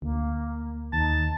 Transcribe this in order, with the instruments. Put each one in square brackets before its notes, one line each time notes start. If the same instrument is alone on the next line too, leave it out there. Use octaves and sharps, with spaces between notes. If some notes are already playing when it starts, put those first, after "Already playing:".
[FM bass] D2 [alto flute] A#3
[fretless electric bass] D#2 [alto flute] D#4 [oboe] A5